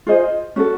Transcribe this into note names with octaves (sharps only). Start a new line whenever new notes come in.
F4 G#4 C5 D#5
C#4 F#4 A4